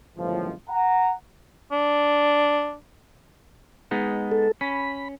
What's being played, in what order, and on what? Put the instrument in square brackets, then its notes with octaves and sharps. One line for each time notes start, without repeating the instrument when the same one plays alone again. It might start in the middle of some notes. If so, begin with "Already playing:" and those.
[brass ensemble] G1 C#2 F#2 A2 D#3 F3
F#5 A#5
[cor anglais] D4
[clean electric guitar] G#3 B3 D#4
[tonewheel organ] A4
[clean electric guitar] C#4 [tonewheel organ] B5